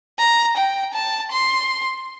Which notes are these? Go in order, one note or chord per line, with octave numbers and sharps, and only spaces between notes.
A#5
G5
A5
C6